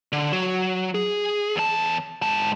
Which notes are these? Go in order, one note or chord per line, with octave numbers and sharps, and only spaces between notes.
D3
F#3
G#4
E2 A5
G#2 A5